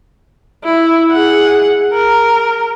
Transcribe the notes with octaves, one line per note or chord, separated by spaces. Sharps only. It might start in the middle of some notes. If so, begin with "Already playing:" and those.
E4
G#4 F#5
A#4